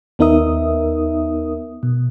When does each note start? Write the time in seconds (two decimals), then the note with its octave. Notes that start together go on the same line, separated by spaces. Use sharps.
0.19 D#2 B3 D#4 A#4 E5 D#6
1.83 B2